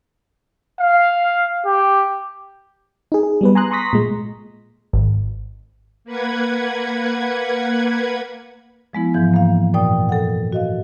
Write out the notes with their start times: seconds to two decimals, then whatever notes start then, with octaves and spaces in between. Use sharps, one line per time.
0.79 F5
1.66 G4
3.12 D#4 G#4
3.23 G#4
3.41 G3 B3 B4
3.55 G#5 A#5 C6 D#6 F#6
3.71 A#5 C6 C#6 D#6 A#6 B6
3.93 A#2 G#3
4.93 G#1
6.05 A#3 B4 F#5 G#6
8.93 F3 G#3 B3 E4
9.14 G#2 E3 F3 G6
9.34 A#3 F5
9.74 F#2 A#2 D5 G5 D#6
10.09 A4 F#5
10.52 F#4 D#5 F5